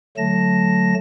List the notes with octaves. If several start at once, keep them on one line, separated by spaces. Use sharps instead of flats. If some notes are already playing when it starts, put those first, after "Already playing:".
D3 F#3 A3 A5 A#6